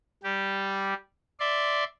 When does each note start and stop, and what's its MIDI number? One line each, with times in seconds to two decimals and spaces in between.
0.23 0.94 55
0.23 0.94 67
1.40 1.84 74
1.40 1.84 76
1.40 1.84 84